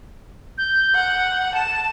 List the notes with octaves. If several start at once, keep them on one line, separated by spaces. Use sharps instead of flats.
G6
F#5 G6
A5 E7